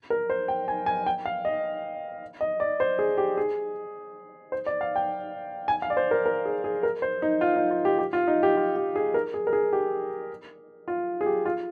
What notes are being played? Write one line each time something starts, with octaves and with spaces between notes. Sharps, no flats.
A#4
C5
G5
G#5
G#5
G5
F5
D#5
D#5
D5
C5
G#4
G4
G#4
C5
D5
F5
G5
G#5
F5
D5
C5
A#4
A#4
G#4
G#4
A#4
C5
D#4
F4
D#4
F4
G4
G4
F4
D#4
G4
F4
G4
G#4
A#4
G#4
A#4
G#4
G4
F4
G#4
G4
F4